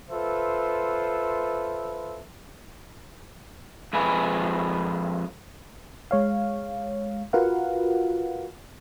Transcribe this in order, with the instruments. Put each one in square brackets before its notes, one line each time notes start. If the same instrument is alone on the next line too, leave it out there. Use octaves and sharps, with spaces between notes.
[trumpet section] F4 A4 B4 C5 E5
[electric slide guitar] F2 G#3 B4 G#5
[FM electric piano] G#3 C#5 F5
F4 F#4 A#4 B4 F5 F#5